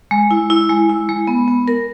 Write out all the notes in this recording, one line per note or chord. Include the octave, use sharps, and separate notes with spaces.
G#3
E4
E4
G#3
E4
G#3
B3
B3
A#4